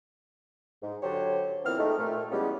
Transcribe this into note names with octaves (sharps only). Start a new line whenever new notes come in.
G#2
D3 F#3 G4 C5 C#5
A#2 E3 B3 C4 F6
G#3 A3 D#4 G4 A4
A#2 A3
E3 G3 G#3 B3 C#4